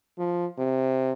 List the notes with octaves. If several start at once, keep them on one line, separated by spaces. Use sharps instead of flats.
F3
C3